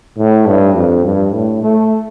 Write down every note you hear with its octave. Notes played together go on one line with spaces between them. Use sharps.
A2
G2
F2
G2
A2
A3